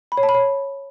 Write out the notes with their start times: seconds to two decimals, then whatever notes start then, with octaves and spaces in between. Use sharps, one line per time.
0.12 B5
0.17 C#5
0.23 A5
0.29 B5
0.34 C#5